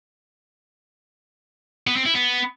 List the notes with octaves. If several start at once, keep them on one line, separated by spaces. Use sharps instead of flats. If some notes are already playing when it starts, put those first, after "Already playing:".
B3
C4
E4
B3